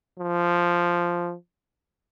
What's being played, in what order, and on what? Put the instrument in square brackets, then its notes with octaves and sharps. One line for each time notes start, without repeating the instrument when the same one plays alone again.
[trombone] F3